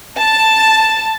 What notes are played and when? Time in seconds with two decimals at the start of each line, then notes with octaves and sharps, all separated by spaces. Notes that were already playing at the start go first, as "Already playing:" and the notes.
0.19 A5